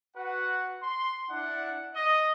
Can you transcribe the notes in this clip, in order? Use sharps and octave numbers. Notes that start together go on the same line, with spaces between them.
F#4 B4 F#5
C6
D4 E4 D5 F#5
D#5